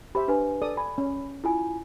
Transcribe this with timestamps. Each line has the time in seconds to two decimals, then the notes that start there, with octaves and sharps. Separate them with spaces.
0.15 G4 C5 E5 B5
0.28 D4 B4 G#5
0.62 A4 D5 D#6
0.77 G#5 B5
0.98 C#4
1.44 E4 F4 G#5